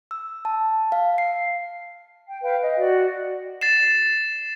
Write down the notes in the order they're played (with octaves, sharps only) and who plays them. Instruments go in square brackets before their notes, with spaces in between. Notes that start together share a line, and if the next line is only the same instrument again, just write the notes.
[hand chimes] E6
A5
F5
C7
[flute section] G5
B4 F5 G5
D#5
F#4 D5
[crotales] A6 C7 E7